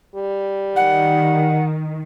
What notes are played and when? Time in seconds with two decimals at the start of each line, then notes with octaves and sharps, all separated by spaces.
0.15 G3
0.76 D#3 F#5